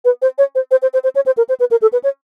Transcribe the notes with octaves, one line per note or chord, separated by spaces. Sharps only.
B4
C5
C#5
C5
C5
C5
C5
C5
C#5
C5
A#4
C5
B4
A#4
A4
B4
C#5